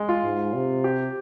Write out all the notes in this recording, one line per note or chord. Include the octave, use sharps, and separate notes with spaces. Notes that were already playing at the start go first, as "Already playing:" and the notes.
Already playing: G#3
F4
G#2
C3
G4